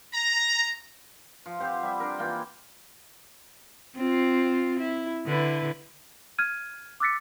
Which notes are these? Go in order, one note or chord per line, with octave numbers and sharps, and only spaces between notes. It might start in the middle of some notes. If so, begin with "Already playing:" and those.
A#5
F3
C4 G4 C5 F#5
G3 E5
D4 A#4
E3 A#3 F4 G5
C4 F4
E4
D3 E4 B4
F6 G#6 D#7
D6 E6 F#6 A6 B6 C#7